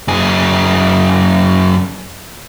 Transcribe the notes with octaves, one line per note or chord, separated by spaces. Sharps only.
F#2 G#4